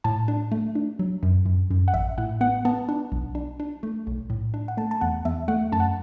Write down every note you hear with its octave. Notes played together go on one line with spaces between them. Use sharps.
A2 A5
D4
A3
D4
F#3
F#2
F#2
F#2
F#5
A1 E5
A2 F#5
B3 F#5
B3 A5
D4
B1
D4
D4
A3
B1
A2
D4
F#5
A3 A5
A5
E2 F#5
E2 E5
A3 F#5
F#2 A5
F#5